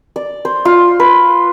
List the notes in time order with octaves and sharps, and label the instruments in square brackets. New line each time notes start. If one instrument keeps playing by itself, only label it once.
[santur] D5
C5
F4
B4